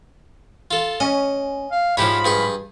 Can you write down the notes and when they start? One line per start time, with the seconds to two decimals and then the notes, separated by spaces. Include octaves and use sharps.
0.71 F4 A4
1.00 C#4 D#5
1.72 F5
1.97 G#2 F3 E4 G4 C#5 B5
2.25 G2 G#4 C#6